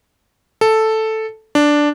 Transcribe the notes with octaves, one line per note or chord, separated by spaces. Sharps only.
A4
D4